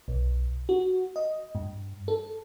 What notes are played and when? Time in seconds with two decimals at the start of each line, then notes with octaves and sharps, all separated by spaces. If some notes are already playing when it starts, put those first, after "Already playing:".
0.08 B1
0.69 F#4
1.16 D#5
1.55 G2
2.08 A4